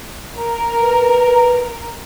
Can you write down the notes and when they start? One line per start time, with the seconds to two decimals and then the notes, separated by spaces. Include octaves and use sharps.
0.37 A#4
0.83 B4